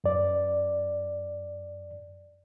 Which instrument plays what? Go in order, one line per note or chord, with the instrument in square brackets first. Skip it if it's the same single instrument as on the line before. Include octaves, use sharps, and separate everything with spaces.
[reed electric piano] F#2 D5